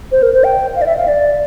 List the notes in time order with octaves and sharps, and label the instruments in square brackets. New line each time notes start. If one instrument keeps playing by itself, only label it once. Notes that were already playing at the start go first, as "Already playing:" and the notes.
[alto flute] C5
A#4
C5
G5
F5
D5
E5
F5
D5